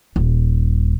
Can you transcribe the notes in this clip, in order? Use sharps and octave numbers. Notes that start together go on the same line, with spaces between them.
D#1